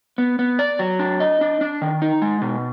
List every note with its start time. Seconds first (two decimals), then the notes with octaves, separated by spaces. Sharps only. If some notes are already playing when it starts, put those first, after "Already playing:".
0.18 B3
0.39 B3
0.59 D5
0.79 F#3
0.99 D4
1.20 D#5
1.41 D4
1.61 D4
1.82 D#3
2.02 D#4
2.22 G#3
2.42 B2